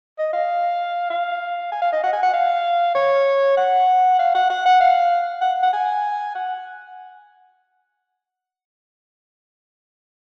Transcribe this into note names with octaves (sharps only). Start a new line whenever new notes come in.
D#5
F5
F5
G#5
F5
D#5
F#5
G#5
F#5
F5
C#5
F#5
F5
F#5
F#5
F#5
F5
F#5
F#5
G#5
F#5